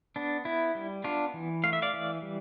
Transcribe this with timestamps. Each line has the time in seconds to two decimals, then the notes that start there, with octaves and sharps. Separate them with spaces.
0.16 B3 D4
0.45 B3 E4
0.75 G3
1.04 B3 D4 F4
1.34 E3
1.64 A3 F5
1.73 E5
1.82 D5 F5
1.94 E3
2.22 G3